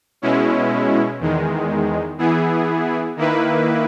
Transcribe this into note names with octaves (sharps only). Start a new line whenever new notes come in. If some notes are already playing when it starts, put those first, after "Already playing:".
B2 G#3 C#4 E4
E2 D#3 G#3
E3 B3 E4 G#4
D#3 A#3 E4 B4